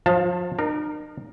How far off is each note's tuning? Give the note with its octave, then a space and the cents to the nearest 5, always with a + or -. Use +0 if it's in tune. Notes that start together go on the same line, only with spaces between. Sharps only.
F3 +30 F5 +0 A5 +10
D#4 -45 A#4 +5